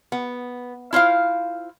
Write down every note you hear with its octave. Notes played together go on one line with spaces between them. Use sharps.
B3
E4 F4 C5 F5